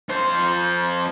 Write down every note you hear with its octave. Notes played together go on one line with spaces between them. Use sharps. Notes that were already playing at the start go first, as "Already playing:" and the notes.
F2 C5